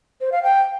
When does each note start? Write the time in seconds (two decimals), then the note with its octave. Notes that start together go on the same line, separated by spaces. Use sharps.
0.21 C5
0.32 F5
0.43 G5